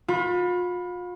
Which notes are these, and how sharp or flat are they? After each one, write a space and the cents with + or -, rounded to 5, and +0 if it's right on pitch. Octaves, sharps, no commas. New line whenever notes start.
F4 +40 B5 +0